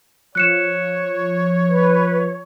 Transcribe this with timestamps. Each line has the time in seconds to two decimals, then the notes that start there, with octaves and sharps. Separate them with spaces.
0.35 F3 C#5 F#6 C#7 E7
1.70 B4